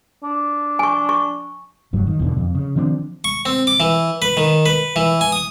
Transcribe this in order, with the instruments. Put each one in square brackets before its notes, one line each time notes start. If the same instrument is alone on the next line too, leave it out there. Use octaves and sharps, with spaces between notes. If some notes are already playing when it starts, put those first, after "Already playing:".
[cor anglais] D4
[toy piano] G#5 C#6
C#6
[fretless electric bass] F1 G2 F#3
D#3
E2 B2 D3
F2
C#3
D#3 F3 C4 D4
[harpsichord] C#6
C4
D6
E3
B4
D#3
B4
E3
G#5
D#6